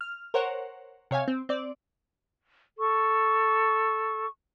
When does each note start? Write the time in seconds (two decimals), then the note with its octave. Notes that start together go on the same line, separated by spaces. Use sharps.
0.01 F6
0.34 A#4 C5 C#5 F#5
1.11 C3 C#5 F5 G#5
1.28 C4
1.49 C4 D5
2.79 A4 C#6